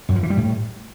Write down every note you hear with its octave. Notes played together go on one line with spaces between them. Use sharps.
F#2
F3
E3
G3
A2